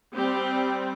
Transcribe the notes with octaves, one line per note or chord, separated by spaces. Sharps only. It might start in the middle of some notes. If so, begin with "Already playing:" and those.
G3 C4 G4